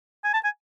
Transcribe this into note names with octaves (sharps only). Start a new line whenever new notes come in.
G#5
A5
G#5